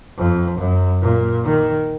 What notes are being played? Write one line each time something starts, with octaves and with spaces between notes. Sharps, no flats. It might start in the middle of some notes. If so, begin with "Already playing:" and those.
F2
F#2
A#2
D#3